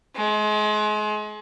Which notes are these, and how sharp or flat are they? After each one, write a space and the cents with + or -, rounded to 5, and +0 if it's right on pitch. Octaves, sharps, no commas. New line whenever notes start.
G#3 +35